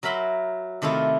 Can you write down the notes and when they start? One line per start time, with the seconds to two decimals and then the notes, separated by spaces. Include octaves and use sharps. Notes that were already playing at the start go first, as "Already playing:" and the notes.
0.03 F#3 A#4 E5 B5 C6
0.82 C3 D#3 A3 E4 F4